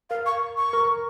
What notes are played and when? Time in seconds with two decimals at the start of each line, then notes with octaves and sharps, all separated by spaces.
0.10 A#4 F5
0.26 C#6
0.57 C#6
0.73 A#4